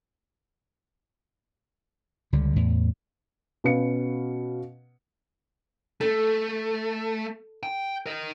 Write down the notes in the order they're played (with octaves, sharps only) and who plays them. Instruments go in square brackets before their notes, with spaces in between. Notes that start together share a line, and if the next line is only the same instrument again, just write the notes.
[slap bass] C#2 D3 G3
E2 A2
[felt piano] B2 C#4 B4 F5 C#7
[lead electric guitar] A3 [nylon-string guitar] A4
[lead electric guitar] G5
A#4 D#5